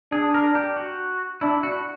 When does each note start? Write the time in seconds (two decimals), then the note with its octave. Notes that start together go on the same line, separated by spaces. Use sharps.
0.12 D4 G#4
0.34 A#4
0.55 G4
0.76 F#4
1.41 D4 E4
1.63 F#4